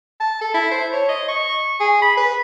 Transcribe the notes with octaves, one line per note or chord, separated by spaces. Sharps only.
A5
A4
E4
C5
C#5
D#5
C#6
G#4
B5
B4